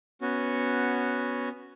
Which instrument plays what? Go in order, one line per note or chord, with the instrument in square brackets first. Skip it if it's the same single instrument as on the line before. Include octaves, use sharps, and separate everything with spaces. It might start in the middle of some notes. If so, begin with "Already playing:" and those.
[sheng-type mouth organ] B3 C#4 F#4